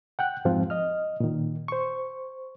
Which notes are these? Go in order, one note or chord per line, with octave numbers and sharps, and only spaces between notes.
F#5 G5 F#6
F2 G#2 F3 C4 F4
D#5 F6
A#2 D#3
C5 C#6